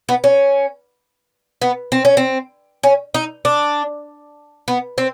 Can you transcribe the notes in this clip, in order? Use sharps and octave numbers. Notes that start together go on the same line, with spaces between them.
B3
C#4
B3
C4
C#4
C4
C#4
D#4
D4
B3
C4